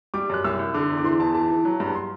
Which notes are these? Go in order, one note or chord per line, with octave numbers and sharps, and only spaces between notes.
G3 D6
F#2 F#6
C2 E6
C2
D3 D6
E2
D6
E3 C6
E2 A5
E3 A5
E3
F#3
G2
C6